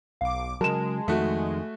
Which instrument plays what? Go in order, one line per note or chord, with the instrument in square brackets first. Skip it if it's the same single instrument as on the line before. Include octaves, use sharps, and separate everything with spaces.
[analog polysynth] B1 D6 [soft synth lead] F5
[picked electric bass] C#3 F#3 [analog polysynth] G#3 [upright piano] A#4 E7 [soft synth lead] A5
[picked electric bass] F2 D#3 [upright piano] A3 F#4